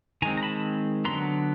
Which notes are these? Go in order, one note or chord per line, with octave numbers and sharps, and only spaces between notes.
D#3 G#3 C4 G#5 A#5
A#5
A5 B5
D3 F#3 B3 A#5 C6